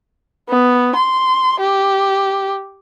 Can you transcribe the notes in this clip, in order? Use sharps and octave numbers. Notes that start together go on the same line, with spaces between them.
B3
C6
G4